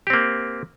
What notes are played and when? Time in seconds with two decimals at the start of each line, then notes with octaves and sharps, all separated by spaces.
0.07 G4
0.10 C4
0.14 A#3